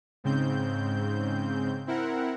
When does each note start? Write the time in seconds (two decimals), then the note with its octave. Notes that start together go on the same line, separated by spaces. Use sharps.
0.24 G#2 C#3 C4 G6
1.87 C4 E4 A#4 F#5